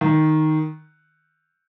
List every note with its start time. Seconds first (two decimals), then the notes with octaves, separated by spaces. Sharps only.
0.01 D#3